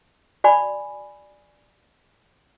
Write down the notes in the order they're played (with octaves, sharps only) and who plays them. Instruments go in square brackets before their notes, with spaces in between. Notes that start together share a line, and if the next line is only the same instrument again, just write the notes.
[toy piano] F#4 D5 G#5 B5